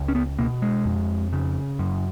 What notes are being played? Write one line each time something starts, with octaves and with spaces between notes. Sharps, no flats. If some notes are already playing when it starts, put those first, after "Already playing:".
Already playing: C#2
C#4
B3
B2 A#3
G#3
F2
C#3
F#2